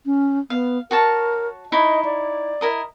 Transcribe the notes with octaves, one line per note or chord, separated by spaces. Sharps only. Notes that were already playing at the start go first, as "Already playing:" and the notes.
C#4
B3 F5
F#4 A#4 C#5 A5
D#4 E4 C#5 D#5
D5
E4 A#4 D#5